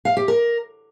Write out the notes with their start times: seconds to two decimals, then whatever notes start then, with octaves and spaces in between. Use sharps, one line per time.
0.05 F5
0.17 G4
0.28 A#4